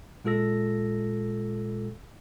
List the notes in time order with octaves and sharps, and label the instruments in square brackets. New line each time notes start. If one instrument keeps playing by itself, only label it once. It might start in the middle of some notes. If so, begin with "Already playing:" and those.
[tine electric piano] A#2 G#3 F4 A4 E6 A#6